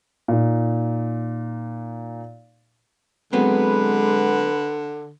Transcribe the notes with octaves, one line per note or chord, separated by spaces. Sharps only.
A#2 D#4
D3 F#3 G#3 B3 C4 B4